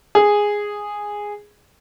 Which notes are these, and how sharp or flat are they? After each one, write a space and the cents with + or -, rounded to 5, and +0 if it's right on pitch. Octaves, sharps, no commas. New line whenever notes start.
G#4 -5